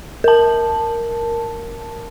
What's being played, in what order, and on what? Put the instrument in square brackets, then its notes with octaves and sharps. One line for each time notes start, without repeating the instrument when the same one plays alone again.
[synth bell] A#4 A5